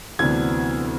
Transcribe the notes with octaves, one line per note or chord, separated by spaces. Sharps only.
D2 C3 E3 B3 D4 G#6